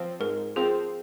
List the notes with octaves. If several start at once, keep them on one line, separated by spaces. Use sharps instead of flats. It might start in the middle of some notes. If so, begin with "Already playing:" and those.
Already playing: F3 C4
G#2 A#4
F3 C4 G#4